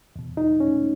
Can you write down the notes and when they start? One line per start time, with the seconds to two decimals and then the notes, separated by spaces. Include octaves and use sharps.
0.16 E2 B2
0.37 D#4
0.60 C#4